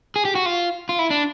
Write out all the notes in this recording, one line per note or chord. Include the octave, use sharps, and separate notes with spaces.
G#4
G4
F#4
F4
F4
E4
D4